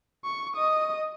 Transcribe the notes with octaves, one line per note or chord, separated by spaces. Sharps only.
C#6
D#5 D#6